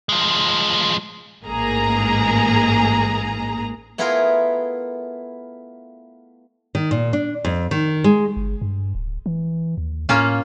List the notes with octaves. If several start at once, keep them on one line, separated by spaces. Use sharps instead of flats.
F3 G#3
A1 G#2 G#3 A#3 G#4 A#5
A3 B3 E4 F4 G#4 A#4
D#3
A#2
D4
F2
D#3
G#3
G1
G2
D1
E3
D#2
A2 A#3 C#4 F4